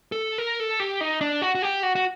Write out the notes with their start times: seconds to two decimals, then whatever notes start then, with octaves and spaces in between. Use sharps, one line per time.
0.12 A4
0.38 A#4
0.60 A4
0.80 G4
1.01 D#4
1.21 D4
1.42 F#4
1.55 F#4
1.62 G4
1.83 F#4
1.96 F#4